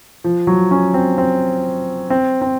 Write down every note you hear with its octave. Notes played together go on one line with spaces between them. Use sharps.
F3
F#3
C#4
C4
C4
C4
C4